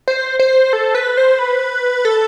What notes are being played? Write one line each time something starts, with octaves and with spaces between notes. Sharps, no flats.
C5
C5
A4
B4
C5
B4
A4